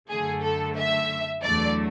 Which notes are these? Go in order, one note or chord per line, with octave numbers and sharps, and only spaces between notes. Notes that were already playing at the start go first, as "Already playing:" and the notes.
F#2 D3 A3 G#4
A4
E5
E2 D3 F#3 A3 D5